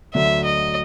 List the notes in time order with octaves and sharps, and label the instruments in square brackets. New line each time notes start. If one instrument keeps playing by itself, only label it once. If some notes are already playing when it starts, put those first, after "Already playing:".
[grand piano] D2 D3 F#3 [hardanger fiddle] E5
[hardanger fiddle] D#5